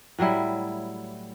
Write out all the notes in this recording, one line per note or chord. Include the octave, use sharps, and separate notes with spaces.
A2 F#3 G3 E4